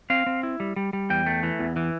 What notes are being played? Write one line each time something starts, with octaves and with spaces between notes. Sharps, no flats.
C4 F5
C4
E4
G3
G3
G3
E2 G5
A3
E3
E2
E3